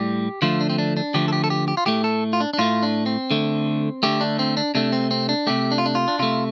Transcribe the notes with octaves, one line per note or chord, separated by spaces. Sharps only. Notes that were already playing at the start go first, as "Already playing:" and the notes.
Already playing: A2 G3 G4
D3 F3 A3 F4
D4
C4
D4
D4
D3 F3 A3 G4
A4
G4
A4
G4
G4
F4
A2 A3 G4
A4
F4
D4
D4
A2 A3 F4
D4
C4
D3 A3
D3 A3 G4
D4
C4
D4
C3 A3 D4
C4
C4
D4
C3 A3 G4
D4
F4
D4
F4
D4
C3 A3 F4